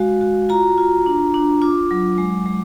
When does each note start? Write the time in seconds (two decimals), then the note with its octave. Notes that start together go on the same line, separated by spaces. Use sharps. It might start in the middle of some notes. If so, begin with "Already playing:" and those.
Already playing: G#3 F#4 F5
0.21 F#4
0.49 F4 A#5
0.78 F4
1.06 D4
1.34 D4
1.62 F4 D6
1.91 F#3
2.18 G#3
2.46 G#3